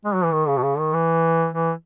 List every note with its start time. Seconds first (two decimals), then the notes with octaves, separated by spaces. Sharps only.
0.05 G#3
0.15 F#3
0.24 E3
0.33 D#3
0.48 C#3
0.57 B2
0.63 C#3
0.78 D#3
0.93 E3
1.54 E3